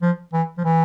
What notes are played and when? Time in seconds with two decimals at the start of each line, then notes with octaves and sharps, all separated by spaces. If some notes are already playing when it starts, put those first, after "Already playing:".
0.02 F3
0.33 E3
0.58 F3
0.64 E3